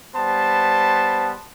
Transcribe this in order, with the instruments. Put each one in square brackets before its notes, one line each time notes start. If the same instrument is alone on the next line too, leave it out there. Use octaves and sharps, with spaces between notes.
[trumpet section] G3 B3 C5 A5